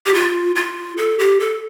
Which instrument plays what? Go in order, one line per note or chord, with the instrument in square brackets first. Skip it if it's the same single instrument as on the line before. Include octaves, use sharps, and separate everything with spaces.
[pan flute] G4
F4
F4
A4
G4
A4